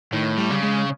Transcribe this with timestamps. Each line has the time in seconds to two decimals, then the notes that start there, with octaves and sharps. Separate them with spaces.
0.13 A2 D#3
0.38 G3
0.50 C#3
0.63 G#3